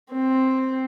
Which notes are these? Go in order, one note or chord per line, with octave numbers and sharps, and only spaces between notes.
C4